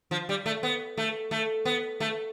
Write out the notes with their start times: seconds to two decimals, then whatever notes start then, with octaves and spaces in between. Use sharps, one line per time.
0.11 F3
0.29 G3
0.46 A3
0.63 B3
0.97 A3
1.31 A3
1.65 B3
2.00 A3